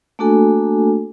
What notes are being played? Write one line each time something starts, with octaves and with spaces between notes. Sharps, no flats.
A3 A#3 D4 F#4 A4 G#5